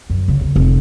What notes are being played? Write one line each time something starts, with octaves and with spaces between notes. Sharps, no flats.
F#2
C#3
D#2
F1